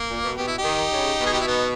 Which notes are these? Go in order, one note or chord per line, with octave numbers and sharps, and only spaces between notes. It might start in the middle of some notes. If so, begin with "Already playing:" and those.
Already playing: A#3
A#2
B2
B2 G4
E4
D#4 G4
D#3
C#3
B2
G#4
G4
E4
B3 D#4